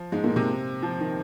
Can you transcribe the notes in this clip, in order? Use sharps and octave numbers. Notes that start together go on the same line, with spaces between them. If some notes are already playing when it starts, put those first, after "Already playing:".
Already playing: F3
G#2 G#3
A#2 A#3
C3 C4
F3
D#3